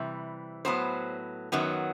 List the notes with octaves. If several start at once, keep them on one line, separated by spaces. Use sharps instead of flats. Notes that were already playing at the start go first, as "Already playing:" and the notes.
Already playing: C3 E3 G3
A2 F#3 B3 C5
F#2 D#3 F#3 B3